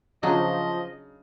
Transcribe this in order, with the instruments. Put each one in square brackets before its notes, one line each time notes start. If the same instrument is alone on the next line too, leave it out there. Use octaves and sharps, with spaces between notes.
[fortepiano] C#3 [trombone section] F3 [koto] F#3 D4 D#4 [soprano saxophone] D#5